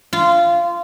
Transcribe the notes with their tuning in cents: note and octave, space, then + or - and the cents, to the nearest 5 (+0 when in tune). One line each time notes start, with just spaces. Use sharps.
F4 -20